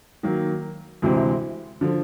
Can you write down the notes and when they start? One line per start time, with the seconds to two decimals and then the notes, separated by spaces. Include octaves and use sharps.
0.23 D#3 F#3 A#3
1.02 D2 C3 E3 G#3 C4
1.81 D3 F3